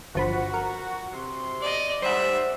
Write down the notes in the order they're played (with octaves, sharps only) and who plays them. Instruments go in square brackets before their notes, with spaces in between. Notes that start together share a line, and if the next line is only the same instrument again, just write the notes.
[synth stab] G1 F3 B5 [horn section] F#4
[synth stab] A#4
[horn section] C3 C6
[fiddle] D5 D#5
[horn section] G3 [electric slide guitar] C5 F#5 [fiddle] E5